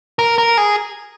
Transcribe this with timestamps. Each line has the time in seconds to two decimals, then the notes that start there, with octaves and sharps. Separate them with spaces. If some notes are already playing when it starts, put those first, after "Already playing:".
0.19 A#4
0.38 A#4
0.57 G#4